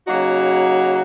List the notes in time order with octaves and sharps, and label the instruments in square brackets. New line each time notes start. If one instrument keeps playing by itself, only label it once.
[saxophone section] C#3 F#3 A#3 D#4 F#4